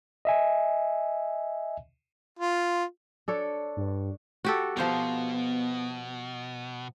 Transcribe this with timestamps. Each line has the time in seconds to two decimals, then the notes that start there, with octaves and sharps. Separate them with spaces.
0.25 D#5 E5 G#5
2.39 F4
3.28 D4 A4 C#5
3.76 G2
4.45 F#4 G4 A4
4.77 B2 F3 B3 C5 A#5